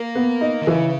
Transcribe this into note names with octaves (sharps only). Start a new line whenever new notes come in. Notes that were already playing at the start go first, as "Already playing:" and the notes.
Already playing: A#3
B3
D#4
D#3
C#3 E3